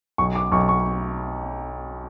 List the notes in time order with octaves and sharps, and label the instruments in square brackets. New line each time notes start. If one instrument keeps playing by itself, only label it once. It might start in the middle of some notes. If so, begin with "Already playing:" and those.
[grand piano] B1 C#6
D6
B1 C#6
C#6